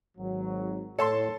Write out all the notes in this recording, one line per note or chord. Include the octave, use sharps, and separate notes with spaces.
G#1 F#3
A2 A4 C#5 A5 C6